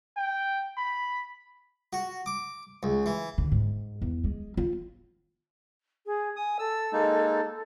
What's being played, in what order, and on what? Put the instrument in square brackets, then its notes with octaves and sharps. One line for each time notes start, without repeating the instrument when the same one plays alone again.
[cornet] G5
B5
[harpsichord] F#4
D6
C#2
E3
[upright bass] D3
G#2
E2
G#3
F4
[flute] G#4
[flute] G#5 [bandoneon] D#6
[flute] A4 [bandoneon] E6
[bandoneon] G#3 A#3 D#4